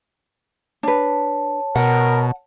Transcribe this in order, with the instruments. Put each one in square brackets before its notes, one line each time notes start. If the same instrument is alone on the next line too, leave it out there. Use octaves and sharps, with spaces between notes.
[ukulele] D4 B4 [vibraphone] C#5 A5
[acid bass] B2 [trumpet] A#4 [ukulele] F#5